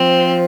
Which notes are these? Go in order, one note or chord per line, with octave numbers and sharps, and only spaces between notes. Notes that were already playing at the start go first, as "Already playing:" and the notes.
Already playing: F3 C4